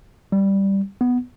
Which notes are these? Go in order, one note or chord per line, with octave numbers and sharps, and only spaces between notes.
G3
B3